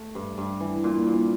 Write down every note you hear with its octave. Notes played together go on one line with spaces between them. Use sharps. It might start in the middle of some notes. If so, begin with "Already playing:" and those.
Already playing: A3
G2
G2
E3
A#2
A#2